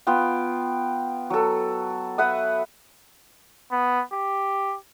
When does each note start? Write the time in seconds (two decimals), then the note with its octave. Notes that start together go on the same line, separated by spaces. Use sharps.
0.07 B3 F4 G5
1.30 F#3 A4
2.18 B4 E5 F#5 D#6
3.72 B3
4.13 G4